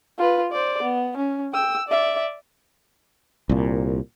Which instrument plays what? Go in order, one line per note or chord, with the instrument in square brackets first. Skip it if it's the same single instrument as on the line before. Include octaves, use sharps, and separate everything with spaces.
[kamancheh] F4 B4
C5 D5
B3
C#4
G5 E6
D5 E5
[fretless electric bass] C2 A#2